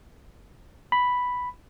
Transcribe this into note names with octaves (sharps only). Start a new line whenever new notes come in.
B5